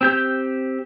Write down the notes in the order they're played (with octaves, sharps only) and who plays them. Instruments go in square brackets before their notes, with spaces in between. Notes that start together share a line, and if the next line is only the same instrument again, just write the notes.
[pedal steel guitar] C4 G4 G6